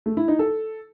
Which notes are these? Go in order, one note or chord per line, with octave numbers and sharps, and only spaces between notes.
A3
E4
D#4
A4